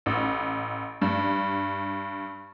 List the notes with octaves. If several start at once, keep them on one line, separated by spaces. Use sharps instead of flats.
A1
G2